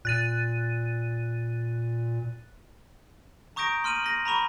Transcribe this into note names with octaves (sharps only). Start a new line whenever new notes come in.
A#2 F#6 A6 D#7
A#5 C#6 D#6 G6 A#6 D7
C6 F6 D#7 F#7
C6 A#6
A#5 B5 C#6 F7